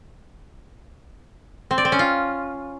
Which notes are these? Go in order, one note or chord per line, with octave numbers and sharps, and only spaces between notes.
C4
D5
C4
C#4
F4